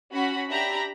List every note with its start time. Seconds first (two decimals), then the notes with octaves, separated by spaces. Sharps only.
0.13 C#4 F#4 F#5 B5
0.49 D4 G4 E5 A#5 B5